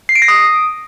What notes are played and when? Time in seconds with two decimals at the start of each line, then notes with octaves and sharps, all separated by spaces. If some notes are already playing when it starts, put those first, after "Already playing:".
0.09 C7
0.15 D7
0.22 A#6
0.28 D#6